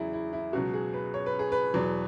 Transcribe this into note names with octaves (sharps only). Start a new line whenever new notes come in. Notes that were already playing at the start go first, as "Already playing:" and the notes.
Already playing: E2 C#3 F#3 E4 G#4
E4
E4
C#2 B2 F#3 F#4
G#4
B4
C#5
B4
G#4
B4
E2 B2 F#3